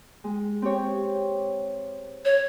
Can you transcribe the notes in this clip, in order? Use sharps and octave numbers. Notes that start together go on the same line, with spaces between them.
G#3
C4 G4 C#5
C#5